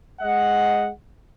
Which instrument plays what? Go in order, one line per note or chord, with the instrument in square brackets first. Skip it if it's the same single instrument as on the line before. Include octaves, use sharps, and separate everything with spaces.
[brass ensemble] G#3 D#5 F#5